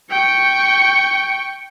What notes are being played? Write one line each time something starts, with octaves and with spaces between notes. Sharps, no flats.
G5 C#6